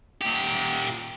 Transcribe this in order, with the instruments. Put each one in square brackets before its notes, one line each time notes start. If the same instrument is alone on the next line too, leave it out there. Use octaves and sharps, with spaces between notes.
[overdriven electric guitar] A#2 G4